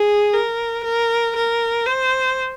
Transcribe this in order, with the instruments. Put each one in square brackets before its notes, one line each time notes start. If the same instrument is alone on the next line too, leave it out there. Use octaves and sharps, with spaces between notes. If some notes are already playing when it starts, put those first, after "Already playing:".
Already playing: [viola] G#4
A#4
A#4
A#4
C5